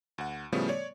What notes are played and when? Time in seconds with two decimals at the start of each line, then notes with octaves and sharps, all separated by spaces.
0.18 D2 F#5
0.52 A2 C#3 F3 G3 A3 B3
0.69 C#5 D5